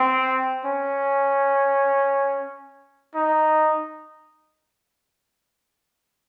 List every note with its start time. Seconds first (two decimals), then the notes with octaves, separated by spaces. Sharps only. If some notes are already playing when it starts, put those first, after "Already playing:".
Already playing: C4
0.65 C#4
3.14 D#4